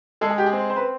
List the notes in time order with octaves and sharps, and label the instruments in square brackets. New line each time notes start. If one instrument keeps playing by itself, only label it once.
[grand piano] G#3 [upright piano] A4
[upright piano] G#4
G4
G#4
[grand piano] C4
[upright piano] C5
B4